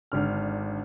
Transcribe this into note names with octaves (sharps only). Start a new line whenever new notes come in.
G#1 D3 F6